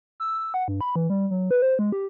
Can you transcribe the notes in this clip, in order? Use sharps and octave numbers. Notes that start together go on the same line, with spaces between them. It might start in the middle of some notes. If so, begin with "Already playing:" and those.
E6
E6
F#5
G2
B5
E3
G3
F#3
B4
C5
G#3
G4